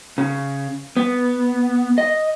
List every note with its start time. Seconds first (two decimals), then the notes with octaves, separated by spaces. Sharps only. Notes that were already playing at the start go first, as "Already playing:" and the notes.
0.18 C#3
0.97 B3
1.98 D#5